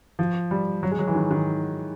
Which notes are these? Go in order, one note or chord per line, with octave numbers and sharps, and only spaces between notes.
F3
G3
F#3
G#3
F#3
E3
D#3
D#3